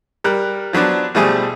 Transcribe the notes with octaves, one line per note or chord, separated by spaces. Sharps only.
G3 A#4 F#6
F3 F#3 B3 D4
B2 F3 G3 A3 G#4 G#5